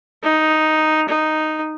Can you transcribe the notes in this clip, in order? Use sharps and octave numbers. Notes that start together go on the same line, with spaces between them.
D#4
D#4